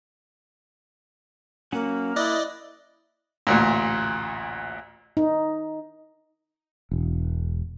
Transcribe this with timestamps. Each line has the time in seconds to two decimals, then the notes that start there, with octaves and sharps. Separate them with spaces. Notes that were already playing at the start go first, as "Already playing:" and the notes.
1.72 F#3 A#3 C#4 F#5
2.16 E4 D5 D#5 F#6
3.47 A1 D2 A#2
5.17 D#4
6.91 E1